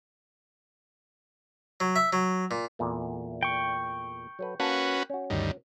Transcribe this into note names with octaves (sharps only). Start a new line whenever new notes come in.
F#3
E5
F#3
A#2
E2 A#2 A3
G5 C#6
F#3 A4 B4
A#3 C#4 F#4 B4 A5
C#4 F#4
D2 G2 D#3